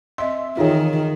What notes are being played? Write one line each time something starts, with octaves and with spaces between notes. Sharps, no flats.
C4 D#5 E5 C6
D#3 E3 D#4 F4 G#4 C#5